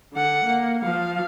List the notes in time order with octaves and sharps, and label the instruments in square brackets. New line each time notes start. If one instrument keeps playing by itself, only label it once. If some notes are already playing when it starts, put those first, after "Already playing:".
[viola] D3 F#5
A#3
F3 F5